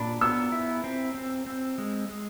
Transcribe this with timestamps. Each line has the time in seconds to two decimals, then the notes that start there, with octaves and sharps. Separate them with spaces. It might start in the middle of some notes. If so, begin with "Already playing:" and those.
Already playing: A#2 D4 B5
0.21 B3 E6
0.52 E4
0.84 C4
1.14 C4
1.46 C4
1.78 G#3
2.09 G#3